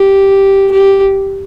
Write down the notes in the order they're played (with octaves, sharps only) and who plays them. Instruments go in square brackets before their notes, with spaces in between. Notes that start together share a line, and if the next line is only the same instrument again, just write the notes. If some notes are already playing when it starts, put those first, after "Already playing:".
Already playing: [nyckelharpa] G4
G4